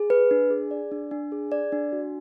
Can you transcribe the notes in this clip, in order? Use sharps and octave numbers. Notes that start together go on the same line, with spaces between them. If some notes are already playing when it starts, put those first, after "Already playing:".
Already playing: G#4
B4
D4
G#4
D5
D4
D4
G#4
D5
D4
F#4